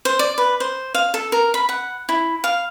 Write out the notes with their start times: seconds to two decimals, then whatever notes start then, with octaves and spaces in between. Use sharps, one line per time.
0.05 C5
0.19 D5
0.38 B4
0.60 C5
0.94 F5
1.14 A4
1.32 A#4
1.54 B5
1.69 F#5
2.09 E4
2.44 F5